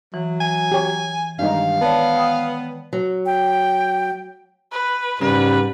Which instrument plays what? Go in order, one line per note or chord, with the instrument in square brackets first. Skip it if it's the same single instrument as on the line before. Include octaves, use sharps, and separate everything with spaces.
[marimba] E3 [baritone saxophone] F#3
[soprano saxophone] G#5
[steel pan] G4 C#5
[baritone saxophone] G2 [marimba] D#3 G#3 [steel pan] D4 D#4 [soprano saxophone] F5
[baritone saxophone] B3 [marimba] C#5 D5 A5
[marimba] G5 B5 D#6
[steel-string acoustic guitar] F#3
[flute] G5
[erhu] B4
[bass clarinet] G#2 [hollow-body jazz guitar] C#3 [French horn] G3 [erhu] B4